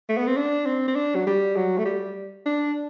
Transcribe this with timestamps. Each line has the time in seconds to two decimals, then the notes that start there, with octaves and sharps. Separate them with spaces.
0.09 A3
0.17 B3
0.27 C4
0.37 D4
0.66 C4
0.88 C4
0.96 D4
1.15 F#3
1.26 G3
1.56 F#3
1.78 A3
1.85 G3
2.46 D4